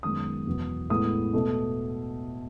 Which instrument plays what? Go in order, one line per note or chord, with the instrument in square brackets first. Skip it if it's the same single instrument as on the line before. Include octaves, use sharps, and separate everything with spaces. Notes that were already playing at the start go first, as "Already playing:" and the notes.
[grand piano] F#2 D#3 G#3 B3 D#6
E2 B2 F#3 B3
A2 G#3 B3 D#6
B2 A3